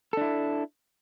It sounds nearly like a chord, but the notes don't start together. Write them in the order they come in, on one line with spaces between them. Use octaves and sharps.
A4 D4 E4